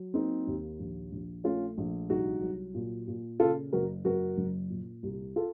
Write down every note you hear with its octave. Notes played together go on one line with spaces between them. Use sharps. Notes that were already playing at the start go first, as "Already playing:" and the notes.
Already playing: F#3
A#3 C4 D#4
D#2
A#1
A#1
A3 C#4 F4
A#1
C2 D#4 F#4
F#3
A#2
A#2
C#3 F4 A4
F#1 F#4 A#4
F#1 F#4 A#4
F#1
A#2
C2
F4 A4